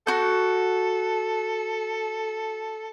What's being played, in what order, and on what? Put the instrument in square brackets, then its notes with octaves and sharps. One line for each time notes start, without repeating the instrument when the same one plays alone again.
[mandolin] F#4 G6 [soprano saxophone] A4